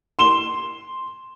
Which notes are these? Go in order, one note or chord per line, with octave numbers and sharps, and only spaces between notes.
C6 E7 G7